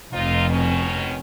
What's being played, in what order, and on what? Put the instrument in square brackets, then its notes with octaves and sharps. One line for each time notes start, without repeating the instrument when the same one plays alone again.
[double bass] F1 F2 [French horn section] C4 D#4 F4
[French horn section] B2 D#3 C#4